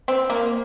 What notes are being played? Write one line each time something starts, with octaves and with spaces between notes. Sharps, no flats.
C4
A#3